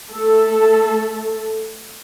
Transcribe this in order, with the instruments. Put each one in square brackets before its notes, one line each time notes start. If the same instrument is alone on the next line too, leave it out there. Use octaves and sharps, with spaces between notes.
[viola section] A3 A4